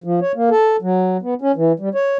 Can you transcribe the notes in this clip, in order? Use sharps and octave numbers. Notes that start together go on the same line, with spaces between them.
F3
C#5
A#3
A4
F#3
B3
C#4
E3
G3
C#5